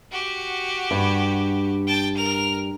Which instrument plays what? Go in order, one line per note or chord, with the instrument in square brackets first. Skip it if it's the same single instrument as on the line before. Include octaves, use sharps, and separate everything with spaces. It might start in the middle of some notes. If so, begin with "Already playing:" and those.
[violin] F#4 G4
[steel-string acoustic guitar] G2
[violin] G5 A5
A#4 F7